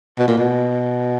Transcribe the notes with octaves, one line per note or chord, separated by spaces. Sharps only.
B2
A#2
B2